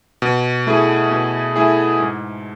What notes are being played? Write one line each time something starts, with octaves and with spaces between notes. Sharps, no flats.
B2
A3 E4 G#4
B2
A3 E4 G#4
G#2